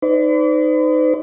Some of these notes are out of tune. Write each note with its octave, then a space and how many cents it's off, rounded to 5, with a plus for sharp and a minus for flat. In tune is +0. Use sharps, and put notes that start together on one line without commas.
D#4 +0 B4 +45 D5 -35